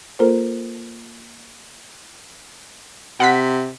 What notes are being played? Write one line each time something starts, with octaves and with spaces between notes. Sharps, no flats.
A#3 F4 A4 A#4 C5
C3 F#5 B6